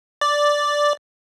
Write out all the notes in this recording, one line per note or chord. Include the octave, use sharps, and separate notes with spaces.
D5